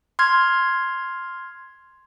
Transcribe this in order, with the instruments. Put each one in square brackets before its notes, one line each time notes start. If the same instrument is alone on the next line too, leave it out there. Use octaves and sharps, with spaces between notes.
[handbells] C6 F6 G#6